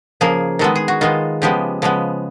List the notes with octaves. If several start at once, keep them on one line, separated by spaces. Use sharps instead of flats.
C#3 F3 A#3 G#4
D#3 G#3 B3 A4
G#4
F#4
D#3 G#3 B3 F4
C#3 F3 G#3 B3 G4
C#3 F3 G#3 B3